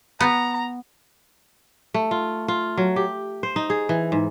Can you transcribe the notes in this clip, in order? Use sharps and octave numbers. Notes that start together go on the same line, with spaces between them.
B3 A#5
A3
F4
F4
F#3
G4
C5
D#4
G#4
E3
G#2